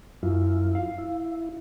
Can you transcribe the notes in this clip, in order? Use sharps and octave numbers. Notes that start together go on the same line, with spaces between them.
F#2 E4 F4
F5
E4